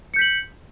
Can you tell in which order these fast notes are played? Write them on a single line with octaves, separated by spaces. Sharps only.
C#7 G6 B6 F#7